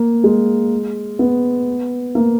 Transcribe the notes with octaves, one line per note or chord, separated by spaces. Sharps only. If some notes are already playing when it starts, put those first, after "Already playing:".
Already playing: A#3
G#3
B3
A#3